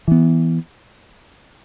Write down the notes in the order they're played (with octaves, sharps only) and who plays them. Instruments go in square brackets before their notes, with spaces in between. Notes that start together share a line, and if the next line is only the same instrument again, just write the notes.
[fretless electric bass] E3 B3